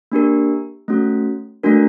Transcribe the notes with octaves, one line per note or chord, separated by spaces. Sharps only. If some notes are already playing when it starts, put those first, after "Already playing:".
A#3 D4 G4 A#4
A3 C#4 F#4
A3 D4 F#4 A#4